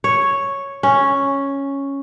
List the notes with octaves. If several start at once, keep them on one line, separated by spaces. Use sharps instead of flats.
C#5
C#4